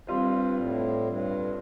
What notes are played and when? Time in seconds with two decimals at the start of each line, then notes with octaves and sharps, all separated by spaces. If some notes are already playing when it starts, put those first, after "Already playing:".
0.07 G2 G3 C4 F4 C5
0.57 A2
1.06 G2